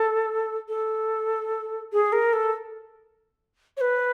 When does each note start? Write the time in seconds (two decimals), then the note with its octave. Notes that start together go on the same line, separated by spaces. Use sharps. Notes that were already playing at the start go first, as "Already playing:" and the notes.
Already playing: A4
0.69 A4
1.93 G#4
2.12 A#4
2.33 A4
3.77 C#5
3.81 B4